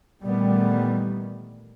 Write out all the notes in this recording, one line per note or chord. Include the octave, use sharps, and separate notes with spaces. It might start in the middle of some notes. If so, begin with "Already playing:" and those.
A#2 D#3 E3 G3 A3 B3